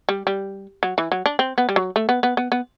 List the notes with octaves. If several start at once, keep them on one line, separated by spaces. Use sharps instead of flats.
G3
G3
F#3
E3
F#3
D4
C4
B3
G3
F#3
A3
B3
B3
B3
B3